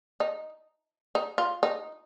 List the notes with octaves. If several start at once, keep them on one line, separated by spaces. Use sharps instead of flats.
D#4
D#4
F4
D#4